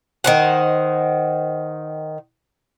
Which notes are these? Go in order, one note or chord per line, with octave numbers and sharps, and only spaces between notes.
D#3 C5 F#5